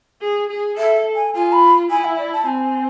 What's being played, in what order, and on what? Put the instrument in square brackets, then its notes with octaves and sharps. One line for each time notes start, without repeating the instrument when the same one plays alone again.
[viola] G#4
G#4
[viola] A4 [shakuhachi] E5
[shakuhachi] G#5
[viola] F4 [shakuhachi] G#5
[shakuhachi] B5
[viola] E4 [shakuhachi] G#5
[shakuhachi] E5
D5
A5
[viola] C4 [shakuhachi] G#5